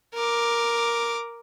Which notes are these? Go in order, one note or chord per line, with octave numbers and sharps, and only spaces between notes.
A#4 D6